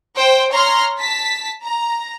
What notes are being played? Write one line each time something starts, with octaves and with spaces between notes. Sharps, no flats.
C5 G5
C#5 A#5 C6 F6
A5 B6
A#5